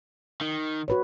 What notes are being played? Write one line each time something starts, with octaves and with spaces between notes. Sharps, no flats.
D#3
F#4 B4 C#5